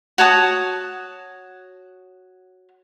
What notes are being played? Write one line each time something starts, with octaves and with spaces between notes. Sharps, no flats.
F#4 C#5 A5 D#6